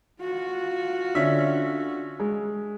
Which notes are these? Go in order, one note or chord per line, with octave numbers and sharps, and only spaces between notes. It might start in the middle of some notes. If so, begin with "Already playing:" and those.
F4 F#4
D3 C#4 E5
G#3